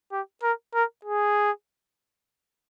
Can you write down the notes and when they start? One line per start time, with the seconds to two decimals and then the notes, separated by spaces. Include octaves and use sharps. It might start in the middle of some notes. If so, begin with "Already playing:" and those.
0.12 G4
0.43 A#4
0.74 A#4
1.05 G#4